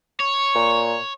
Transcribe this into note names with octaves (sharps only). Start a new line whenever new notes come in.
C#5 C#6
A#2